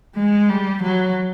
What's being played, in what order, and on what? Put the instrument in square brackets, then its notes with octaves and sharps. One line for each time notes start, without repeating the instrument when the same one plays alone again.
[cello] G#3
G3
F#3